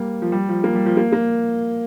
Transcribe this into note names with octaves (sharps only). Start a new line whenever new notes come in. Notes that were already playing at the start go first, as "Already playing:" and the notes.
Already playing: G3 A#3
F3
G3
F3
A#3
G3
F3
A#3
A#3